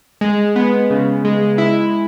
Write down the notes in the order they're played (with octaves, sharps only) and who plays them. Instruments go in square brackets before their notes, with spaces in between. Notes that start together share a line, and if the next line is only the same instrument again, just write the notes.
[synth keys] G#3
B3
C#3
G#3
E4